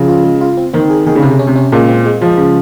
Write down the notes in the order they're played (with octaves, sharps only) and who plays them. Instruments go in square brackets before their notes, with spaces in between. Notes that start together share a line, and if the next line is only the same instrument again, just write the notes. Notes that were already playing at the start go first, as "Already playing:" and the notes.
Already playing: [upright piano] C#3 [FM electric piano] F3
[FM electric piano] F4
G#3
F4
C4
[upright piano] D#3 [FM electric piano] C4
[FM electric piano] G#4
[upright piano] D#3 [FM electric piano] G#4
[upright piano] C#3
[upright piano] C3 [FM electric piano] C#4
[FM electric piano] C#4
[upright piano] C3
[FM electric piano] C#4
[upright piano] A#2 [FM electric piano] G#3
[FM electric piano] C4
G#3
[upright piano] F3 [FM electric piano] G#3
[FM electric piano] C#3